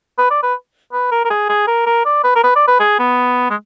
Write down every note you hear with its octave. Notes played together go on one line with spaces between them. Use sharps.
B4
D5
B4
B4
A#4
A#4
G#4
G#4
A#4
A#4
D5
B4
A#4
B4
D5
B4
G#4
B3
G#3